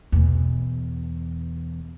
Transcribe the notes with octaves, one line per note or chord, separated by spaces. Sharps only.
E2 B2